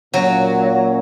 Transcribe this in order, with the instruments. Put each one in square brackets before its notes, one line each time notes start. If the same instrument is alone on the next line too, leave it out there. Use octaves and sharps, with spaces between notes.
[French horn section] A#2 A#3 C#4 [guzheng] F#3